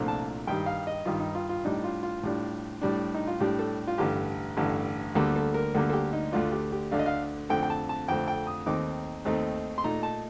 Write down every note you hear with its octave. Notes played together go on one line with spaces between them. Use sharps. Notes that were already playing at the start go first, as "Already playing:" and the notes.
Already playing: C2 A#2 F3 A3 D4
A5
G2 D#3 G3 G5
F5
D#5
G2 D#3 G3 F4
D#4
F4
F4
A2 G3 D4 D#4
F4
F4
A2 G3 D4
A2 G3 D4
D#4
F4
A2 G3 D4 G4
A4
F4
A1 G2 D3 G4
A1 G2 D3
D2 D3 G3 A#3 A4
A4
A#4
D2 D3 G3 A#3 A4
A4
G4
D#4
D2 D3 A3 D4 F4
G4
G4
D2 D3 A3 D4 F5
D#5
F5
F2 D3 A3 C4 G5
G5
A5
A5
F2 D3 A3 C4 G5
G5
D#6
D#2 D#3 A3 C4 D#4 D6
D#2 D#3 A3 C4 D#4
C6
A#2 A3 D#4 A#5
A5